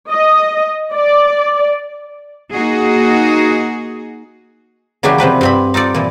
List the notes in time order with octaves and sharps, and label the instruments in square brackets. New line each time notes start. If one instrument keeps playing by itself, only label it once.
[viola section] D#5
D5
[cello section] A#3 D#4 F#4 G#4
[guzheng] C#3 E3 F#3 A#3 D4 G4
C3 F3 B4 G5
G2 C4 B5
D#4 F4 A4 D5
A#2 E3